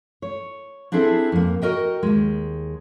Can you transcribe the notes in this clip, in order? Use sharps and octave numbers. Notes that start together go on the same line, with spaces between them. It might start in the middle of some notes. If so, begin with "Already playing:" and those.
C#5
C4 D4 E4 G#4 A4 C5
F2 A#3
F#4 A#4 D#5 G5
D#2 G#2 G#3